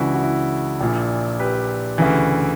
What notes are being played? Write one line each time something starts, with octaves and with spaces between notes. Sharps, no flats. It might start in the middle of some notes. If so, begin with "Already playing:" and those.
Already playing: C#2 C#3 E3 D4 E4 F#4
F#4
E4
A#1 A#2
G4 B4
D2 C#3 E3